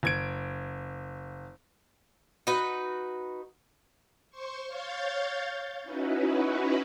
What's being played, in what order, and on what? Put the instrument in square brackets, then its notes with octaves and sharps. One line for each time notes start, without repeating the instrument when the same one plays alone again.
[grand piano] F#1 G#6 D7
[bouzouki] D#4 F#4 B4
[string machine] C5 C6 C#6
C#5 F5 G6 A6
C#4 D#4 E4 F#4 B4